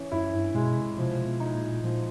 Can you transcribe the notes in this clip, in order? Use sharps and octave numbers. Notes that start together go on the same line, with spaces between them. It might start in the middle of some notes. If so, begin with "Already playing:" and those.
Already playing: E3 C#4
F#2 E4
G2
B2 G#3
C3
B2 F3
C3
B2
B2
D#4
A#2
A#2 F3